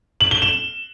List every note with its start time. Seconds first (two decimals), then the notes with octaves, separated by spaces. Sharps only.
0.21 F#7
0.31 G7
0.42 E7